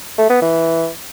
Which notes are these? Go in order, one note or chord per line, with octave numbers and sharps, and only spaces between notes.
A3
B3
E3